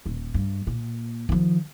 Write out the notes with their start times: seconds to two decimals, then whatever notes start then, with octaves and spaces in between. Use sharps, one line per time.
0.06 D#1
0.34 G2
0.67 A#2
1.29 D#3 F3